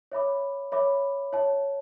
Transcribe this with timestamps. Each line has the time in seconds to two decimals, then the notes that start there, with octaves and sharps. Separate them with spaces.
0.12 C#5 E5 B5 D6
0.72 C#5 E5 B5 D6
1.33 C#5 E5 A5